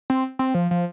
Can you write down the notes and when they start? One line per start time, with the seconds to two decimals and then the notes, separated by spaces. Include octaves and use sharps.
0.10 C4
0.39 C4
0.54 F3
0.71 F3